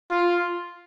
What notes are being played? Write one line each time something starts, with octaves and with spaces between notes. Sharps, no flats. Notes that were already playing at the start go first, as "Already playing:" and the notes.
F4